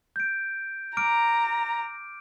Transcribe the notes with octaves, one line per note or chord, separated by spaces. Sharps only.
G6 D7
A#5 D6 F6 D7